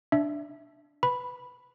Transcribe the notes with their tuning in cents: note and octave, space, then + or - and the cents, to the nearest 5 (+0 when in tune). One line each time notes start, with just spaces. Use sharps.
D4 +0 E5 +0
B4 +10 B5 +0